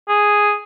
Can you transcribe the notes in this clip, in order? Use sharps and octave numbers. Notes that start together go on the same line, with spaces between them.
G#4